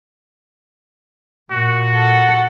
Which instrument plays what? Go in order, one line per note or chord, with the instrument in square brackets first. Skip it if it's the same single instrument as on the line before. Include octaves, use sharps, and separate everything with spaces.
[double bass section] A#2 [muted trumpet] F#4
[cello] A4 F#5